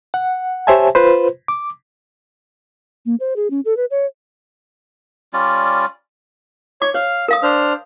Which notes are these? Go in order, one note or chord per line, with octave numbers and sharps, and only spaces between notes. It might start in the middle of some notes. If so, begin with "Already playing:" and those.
F#5
G4 C5 C#5 E5 G#5 A5
F4 B4 C5
D6
A#3
C5
G#4
C#4
A4
B4
C#5
G3 C#4 F4 D5
C#5 D6
C#5 F5
A#4 F5 D#6
D4 C5 F6